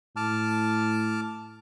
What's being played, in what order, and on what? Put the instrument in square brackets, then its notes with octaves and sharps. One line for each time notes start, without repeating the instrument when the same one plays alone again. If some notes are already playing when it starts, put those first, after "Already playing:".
[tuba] A2 [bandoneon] A5 D6 F6